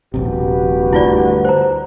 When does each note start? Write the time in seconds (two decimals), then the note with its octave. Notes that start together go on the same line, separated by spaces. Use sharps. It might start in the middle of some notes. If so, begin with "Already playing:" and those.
0.14 D#1 A#1 C3 F#4 G4 B4
0.93 D2 G2 E4 F4 D5
1.45 C5 A#5